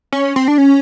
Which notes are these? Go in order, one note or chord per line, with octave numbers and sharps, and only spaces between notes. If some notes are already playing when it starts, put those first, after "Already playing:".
C#4
C4
D4
C#4